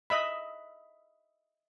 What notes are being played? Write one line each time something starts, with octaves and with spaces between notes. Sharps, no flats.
D#5 E5 B5